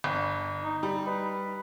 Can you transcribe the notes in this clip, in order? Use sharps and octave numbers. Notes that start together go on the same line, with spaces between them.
G1
D#4
G3
B4